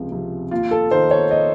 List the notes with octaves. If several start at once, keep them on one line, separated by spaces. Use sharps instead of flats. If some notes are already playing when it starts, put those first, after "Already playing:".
Already playing: C#2 C3 F3
C3 F3
D#2 F4
A4
D#3 C5
C#5
D#5